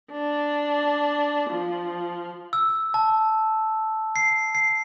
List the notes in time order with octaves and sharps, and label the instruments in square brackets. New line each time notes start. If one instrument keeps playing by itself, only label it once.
[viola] D4
F3
[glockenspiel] E6
A5
C7
C7